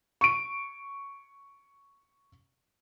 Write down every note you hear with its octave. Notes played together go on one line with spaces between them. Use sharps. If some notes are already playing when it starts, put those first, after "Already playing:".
C#6 D7